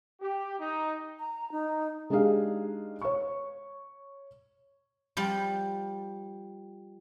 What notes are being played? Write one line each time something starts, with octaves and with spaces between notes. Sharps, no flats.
G4
D#4
A#5
D#4
G#3 D4 D#4 G4 G#4 F5
C#5 C#6
F3 G3